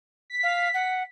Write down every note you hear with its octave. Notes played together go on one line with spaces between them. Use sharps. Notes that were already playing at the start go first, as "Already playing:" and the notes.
B6
F5
F#5